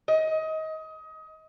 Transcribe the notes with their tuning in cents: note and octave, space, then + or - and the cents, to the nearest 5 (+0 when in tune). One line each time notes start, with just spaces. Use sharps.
D#5 +25